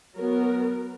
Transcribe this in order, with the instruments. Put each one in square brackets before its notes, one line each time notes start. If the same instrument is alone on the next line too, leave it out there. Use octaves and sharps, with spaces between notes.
[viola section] F#3 B3 A#4